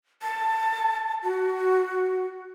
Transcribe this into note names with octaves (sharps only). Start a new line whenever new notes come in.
A5
F#4